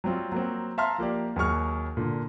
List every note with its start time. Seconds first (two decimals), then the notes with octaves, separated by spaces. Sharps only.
0.04 F#3 G3 C4 F4
0.32 F#3 A#3 C4
0.78 E5 F5 A5 A#5 C6 F6
0.98 F3 A#3 G4 D5
1.36 D#2 F#3 G#4 C#6 F6
1.97 A#2 D3